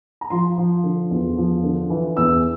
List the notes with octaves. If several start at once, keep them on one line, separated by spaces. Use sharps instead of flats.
A#5
F3 C6
F3
D3
E2
F3
D3
E3
E2 E6